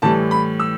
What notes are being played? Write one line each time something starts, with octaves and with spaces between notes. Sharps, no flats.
A2 E3 G3 A5
B5
E6